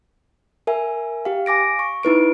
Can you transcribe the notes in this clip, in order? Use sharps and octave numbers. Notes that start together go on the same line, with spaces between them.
A#4 E5 G#5
G4 F5
G#5 D6 A#6 D7
C#6
D#4 E4 B4 D7